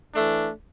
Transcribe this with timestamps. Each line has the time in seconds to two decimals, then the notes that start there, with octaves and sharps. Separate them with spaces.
0.14 E3 A3 D4